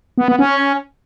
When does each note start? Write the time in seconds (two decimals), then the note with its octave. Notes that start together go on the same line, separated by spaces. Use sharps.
0.18 B3
0.28 B3
0.39 C#4